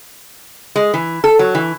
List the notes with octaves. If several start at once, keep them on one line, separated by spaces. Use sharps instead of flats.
G#3
E3
A4
F#3
E3